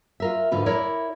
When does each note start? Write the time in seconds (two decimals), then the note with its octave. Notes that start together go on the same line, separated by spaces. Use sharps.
0.20 F4 A#4 E5
0.51 G#2 D3 F4 B4
0.66 E4 A#4 C#5 D5